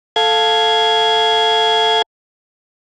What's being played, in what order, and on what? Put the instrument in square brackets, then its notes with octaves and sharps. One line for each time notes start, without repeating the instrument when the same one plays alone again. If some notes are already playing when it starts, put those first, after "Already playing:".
[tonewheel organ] A4 F5 G#6